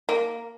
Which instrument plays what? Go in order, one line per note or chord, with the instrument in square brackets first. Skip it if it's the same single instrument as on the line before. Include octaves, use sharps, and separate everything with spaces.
[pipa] A#3